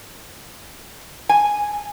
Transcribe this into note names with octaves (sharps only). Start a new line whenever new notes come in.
G#5